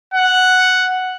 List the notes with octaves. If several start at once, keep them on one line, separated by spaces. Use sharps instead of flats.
F#5